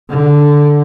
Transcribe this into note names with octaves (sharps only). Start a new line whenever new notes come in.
D3